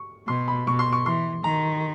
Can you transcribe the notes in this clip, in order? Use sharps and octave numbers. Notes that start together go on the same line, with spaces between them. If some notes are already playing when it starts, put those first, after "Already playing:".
Already playing: C#6
B2 C6
B5
B2 C#6
C6
C#6
E3 C6
D#3 A#5